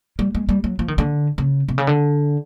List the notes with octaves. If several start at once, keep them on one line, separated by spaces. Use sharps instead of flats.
G3
G#3
G3
F#3
F3
D#3
D3
C#3
C3
C#3
D3